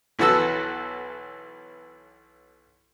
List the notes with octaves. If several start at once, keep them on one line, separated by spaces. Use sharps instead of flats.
B1 E3 B3 F#4 A4 E6